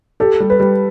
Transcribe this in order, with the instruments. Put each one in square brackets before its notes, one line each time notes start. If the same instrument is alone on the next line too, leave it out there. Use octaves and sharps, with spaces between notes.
[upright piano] G4 [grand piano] A4
[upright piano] G3
[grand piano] B4
[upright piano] G3